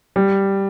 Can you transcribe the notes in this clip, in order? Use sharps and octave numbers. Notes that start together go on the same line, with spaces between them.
G3